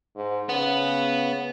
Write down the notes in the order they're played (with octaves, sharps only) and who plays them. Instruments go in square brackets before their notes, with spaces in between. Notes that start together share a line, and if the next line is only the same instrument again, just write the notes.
[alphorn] G#2
[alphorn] C#3 [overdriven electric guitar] B3